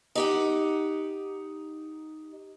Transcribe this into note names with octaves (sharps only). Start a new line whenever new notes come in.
D#4 G4 F#5